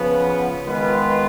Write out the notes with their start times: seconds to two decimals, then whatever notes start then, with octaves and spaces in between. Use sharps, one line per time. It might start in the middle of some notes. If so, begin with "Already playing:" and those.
Already playing: C#3 F3 B3
0.64 D#3 G#3 B3 F4 B4